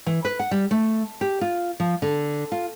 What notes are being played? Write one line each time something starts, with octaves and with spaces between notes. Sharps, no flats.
E3
B4
F#5
G3
A3
G4
F4
F3
D3
F4